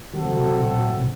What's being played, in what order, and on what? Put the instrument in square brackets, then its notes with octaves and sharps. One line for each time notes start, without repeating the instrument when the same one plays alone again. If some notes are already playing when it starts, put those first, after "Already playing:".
[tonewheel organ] D#3 [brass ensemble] F#3 A3 C4 F#4 A4
[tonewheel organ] C#3
C3
C3
A#2
A#2
A2
C3